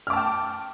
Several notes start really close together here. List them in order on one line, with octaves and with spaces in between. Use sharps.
F6 D6 A5 G5